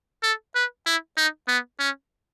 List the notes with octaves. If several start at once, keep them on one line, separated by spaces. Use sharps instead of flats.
A4
B4
E4
D#4
B3
C#4